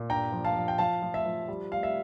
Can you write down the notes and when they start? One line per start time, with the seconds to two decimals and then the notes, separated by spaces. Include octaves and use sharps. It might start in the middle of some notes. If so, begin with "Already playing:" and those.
Already playing: A#2
0.10 G2 G5 A#5
0.32 F3
0.44 F5 A5
0.56 F3
0.68 G5
0.78 F3 F5 A5
1.02 F3
1.14 E5
1.25 F3
1.48 G3
1.72 G3 F5
1.83 E5